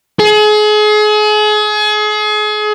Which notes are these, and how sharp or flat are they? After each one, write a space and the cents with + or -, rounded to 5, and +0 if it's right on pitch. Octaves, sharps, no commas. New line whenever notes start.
G#4 +35